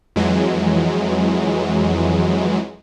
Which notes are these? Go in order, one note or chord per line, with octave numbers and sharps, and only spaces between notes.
F2 E3 F#3 G#3